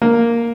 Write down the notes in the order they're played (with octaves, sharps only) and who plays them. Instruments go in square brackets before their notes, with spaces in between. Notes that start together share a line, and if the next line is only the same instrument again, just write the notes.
[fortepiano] A#3